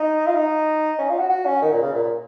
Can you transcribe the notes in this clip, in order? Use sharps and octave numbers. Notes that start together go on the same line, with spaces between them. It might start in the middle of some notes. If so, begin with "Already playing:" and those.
Already playing: D#4
F4
D#4
C#4
F4
F#4
F#4
C#4
D#3
A#2
C#3
A#2
A#2